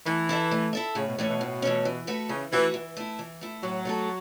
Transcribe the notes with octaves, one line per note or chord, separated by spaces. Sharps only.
E3 A3
E4 A4 E5
A3
E4 A4 E5
A2 C#3
B2
A2 E3 A3 C#4
B2
A2
E3 A3 C#4
E3
A3 F#4 B4
C#3 E3
E3 A3 F#4 B4
E3
A3 E4
E3
A3 E4
A2 F#3
A3 F#4 A4